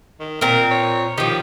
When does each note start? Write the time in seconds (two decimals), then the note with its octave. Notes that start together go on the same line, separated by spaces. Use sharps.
0.20 D#3
0.41 A#2 C4 A#4
0.71 C#5
1.18 D#3 F3 G4